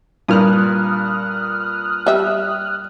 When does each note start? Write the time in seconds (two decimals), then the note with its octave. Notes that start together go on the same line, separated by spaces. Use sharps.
0.28 G2 A#2 D#6 F6 F#6
2.06 G3 E5